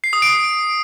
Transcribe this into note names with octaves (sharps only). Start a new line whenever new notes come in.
C7
D#6
D7